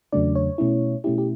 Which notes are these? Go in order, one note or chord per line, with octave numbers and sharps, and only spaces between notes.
E2 C#3 F#3 A3 D4 D5
C#5
B2 A3 C#4 E4
B2 A3 C#4 E4 G4
G4